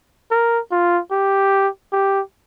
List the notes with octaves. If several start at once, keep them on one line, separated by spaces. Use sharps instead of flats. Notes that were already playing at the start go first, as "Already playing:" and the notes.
A#4
F4
G4
G4